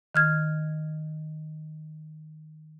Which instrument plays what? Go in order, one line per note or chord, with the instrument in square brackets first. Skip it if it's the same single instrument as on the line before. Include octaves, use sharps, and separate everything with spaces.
[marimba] D#3 F6 G#6